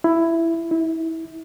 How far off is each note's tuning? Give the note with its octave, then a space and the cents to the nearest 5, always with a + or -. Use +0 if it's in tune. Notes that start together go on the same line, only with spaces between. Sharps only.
E4 +10
E4 -25